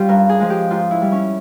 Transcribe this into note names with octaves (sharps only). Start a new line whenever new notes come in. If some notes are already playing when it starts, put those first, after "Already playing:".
Already playing: G3 C#4 F4 G4
G2 A#4
G#4
F3 G#3
G4
G#2 F4
E4
G3
C#4